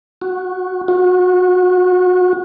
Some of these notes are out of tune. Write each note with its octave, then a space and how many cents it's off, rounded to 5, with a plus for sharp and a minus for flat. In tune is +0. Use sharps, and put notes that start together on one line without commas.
F#4 -5
F#4 -30